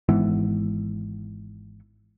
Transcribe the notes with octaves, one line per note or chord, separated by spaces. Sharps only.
G#1 G#2 E3 B3